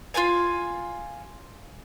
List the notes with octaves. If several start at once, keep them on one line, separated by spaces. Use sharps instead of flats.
F4 C#5 F5 G#5